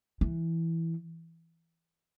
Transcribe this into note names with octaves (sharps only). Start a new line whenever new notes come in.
E3